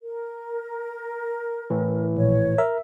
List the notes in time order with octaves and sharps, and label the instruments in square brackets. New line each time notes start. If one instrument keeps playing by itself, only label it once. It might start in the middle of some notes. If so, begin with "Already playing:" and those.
[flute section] A#4
[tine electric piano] A2 E3
[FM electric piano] A#1 [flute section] C#5
[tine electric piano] A#4 [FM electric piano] E5